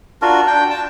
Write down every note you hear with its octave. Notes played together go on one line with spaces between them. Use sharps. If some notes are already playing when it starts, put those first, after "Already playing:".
D4 F4 F#4 A#4
D4 G5
A5